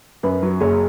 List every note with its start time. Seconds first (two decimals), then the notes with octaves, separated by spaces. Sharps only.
0.23 F#2 B4
0.43 F#3
0.60 F#1 G#4 C#5